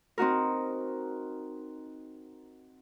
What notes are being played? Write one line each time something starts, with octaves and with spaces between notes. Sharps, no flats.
C4 D#4 F#4 A#4